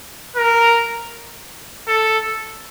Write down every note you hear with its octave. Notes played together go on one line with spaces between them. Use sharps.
A#4
A4